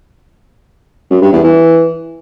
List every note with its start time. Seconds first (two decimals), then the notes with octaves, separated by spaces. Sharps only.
1.10 F#2
1.22 G2
1.33 E2
1.44 E3